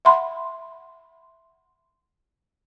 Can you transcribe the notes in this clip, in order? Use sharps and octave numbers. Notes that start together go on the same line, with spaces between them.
E5 F#5 B5 C6